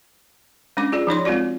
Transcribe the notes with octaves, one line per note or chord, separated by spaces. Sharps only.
G#3 C#4 D4 D6
F4 G#4 D5
F3 D#4 C#5 C6
G#3 C4 F4 F#4 D5